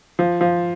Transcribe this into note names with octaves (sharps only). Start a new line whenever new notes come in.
F3
F3